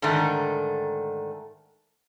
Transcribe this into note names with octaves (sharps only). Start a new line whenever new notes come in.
G#2 D3 D#3 A3